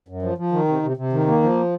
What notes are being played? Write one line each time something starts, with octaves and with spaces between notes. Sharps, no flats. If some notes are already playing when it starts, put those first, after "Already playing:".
F#2
F3
F3
D#3
C3
C3
C3
D#3
A#3
F3